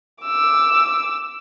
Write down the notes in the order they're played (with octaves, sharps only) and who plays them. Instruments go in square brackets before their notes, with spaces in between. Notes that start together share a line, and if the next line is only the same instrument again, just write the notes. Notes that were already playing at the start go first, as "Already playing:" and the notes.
[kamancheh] D6 E6